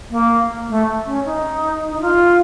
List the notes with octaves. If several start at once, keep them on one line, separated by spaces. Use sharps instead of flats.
A#3
A3
C#4
D#4
D#4
F4